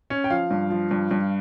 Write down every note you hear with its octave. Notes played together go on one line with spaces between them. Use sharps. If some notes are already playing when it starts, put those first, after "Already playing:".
C#4
G5
F3 F5
G2
F3
G2
G2